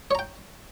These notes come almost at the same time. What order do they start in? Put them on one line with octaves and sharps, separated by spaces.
C#5 A#5 G5